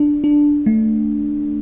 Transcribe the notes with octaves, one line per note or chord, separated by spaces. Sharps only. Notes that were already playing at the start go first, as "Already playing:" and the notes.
Already playing: D4
D4
A3